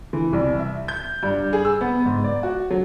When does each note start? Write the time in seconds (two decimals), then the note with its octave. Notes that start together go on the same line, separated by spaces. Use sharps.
0.13 E3
0.33 C2
0.59 E5
0.88 G6
1.23 G2
1.53 G#4
1.65 E6
1.81 B3
2.06 G#2
2.24 D5
2.43 F#4
2.70 F#3